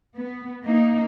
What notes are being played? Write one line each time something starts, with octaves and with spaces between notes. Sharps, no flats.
B3
A#3 D#4